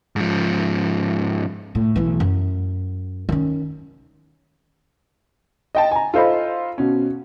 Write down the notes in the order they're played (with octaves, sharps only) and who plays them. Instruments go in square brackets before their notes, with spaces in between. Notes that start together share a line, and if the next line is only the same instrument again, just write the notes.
[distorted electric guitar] G#2 F3
[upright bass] A2
B1 E3
F#2
D#3 C#4
[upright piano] D#5 G5 A5
G#5 A#5
F4 A4 C5 D#5 B5
B2 C#4